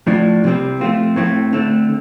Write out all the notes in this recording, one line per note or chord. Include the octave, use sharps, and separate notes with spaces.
A2 F3 D4
C2 C3 G3 C4
F3 A3 C4 F4
A2 A3 C4
D3 A3 C4